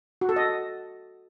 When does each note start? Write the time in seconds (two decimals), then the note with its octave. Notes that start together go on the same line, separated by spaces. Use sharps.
0.21 F#4
0.29 A4
0.36 D#5